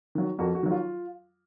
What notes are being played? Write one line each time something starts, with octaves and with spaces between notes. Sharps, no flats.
D#3 F#3
F2 F#4 A#4
F#4
D#3 F#3
F4